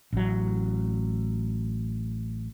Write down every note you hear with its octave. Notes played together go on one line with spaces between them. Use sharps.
A1 F#3